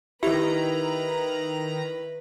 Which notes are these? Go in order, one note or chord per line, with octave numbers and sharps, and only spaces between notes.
D#3 E4 G4 B4 A#5